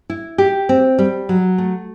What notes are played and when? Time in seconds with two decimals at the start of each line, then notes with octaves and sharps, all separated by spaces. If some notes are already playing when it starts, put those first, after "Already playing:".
0.09 E4
0.38 G4
0.69 C4
0.98 G3
1.29 F#3
1.58 A3